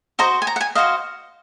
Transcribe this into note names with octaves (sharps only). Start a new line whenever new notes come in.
F#4 C5 D#5 A#5
G#5
A#5
F#5
G#5
F#4 C5 D#5 F5